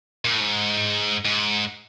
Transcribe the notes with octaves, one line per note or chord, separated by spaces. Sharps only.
A#2
A2
G#2
G#2